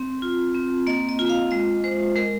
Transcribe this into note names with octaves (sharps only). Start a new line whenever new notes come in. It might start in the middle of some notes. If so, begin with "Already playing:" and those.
Already playing: C4
F4
C4
A#3 D#5
D#5
F4
F5
G#3 D#5
G#3 C5
G#3 A#4